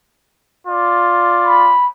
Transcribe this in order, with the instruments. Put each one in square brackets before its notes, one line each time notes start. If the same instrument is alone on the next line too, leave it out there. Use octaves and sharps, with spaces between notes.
[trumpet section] F4 D5
[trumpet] B5